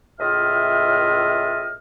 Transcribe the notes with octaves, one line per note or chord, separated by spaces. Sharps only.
C#2 A2 F4 D#5 E5 F6